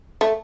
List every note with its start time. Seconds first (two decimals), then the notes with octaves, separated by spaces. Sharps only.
0.21 A3